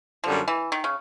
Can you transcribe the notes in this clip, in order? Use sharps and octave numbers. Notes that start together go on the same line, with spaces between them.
F#2 D3 F3 G3
E3
D#3
C#3